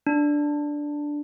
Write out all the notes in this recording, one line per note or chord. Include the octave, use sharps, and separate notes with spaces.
D4